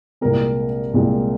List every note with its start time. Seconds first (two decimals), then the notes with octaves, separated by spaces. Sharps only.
0.21 C2 A#2 G#3 C4 A#4
0.94 C2 A#2 G#3 C4